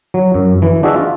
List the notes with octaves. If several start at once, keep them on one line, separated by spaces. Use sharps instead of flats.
F#3
F#2
E3
D4 F#4 G#4 D#5 E5
F4